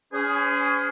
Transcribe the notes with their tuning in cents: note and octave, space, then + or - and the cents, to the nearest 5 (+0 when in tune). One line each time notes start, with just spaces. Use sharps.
C#4 +35 G#4 +0 C5 -40